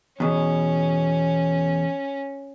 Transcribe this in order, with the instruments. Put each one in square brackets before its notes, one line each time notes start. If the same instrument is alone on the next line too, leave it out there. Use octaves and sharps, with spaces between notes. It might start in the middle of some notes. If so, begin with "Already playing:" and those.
[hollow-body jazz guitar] E2 B2 [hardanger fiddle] C#4